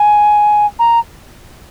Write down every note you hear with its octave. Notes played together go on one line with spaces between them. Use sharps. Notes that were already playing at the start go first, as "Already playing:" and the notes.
Already playing: G#5
A#5